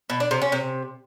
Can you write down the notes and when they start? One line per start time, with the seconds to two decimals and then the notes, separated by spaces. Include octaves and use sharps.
0.10 B2
0.20 D4
0.31 C3
0.42 C#4
0.52 C3